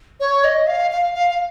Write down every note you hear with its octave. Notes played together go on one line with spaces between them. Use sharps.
C#5
D#5
F5
F5
F5
F5